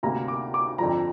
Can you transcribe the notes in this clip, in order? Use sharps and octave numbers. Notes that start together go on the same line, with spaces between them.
D2 C3 A#3 A#5
D6
D6
F2 D3 F3 A#5